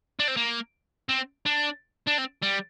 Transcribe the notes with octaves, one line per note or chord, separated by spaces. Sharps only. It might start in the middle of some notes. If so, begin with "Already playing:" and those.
D4
C4
A#3
C4
D4
D4
C4
G3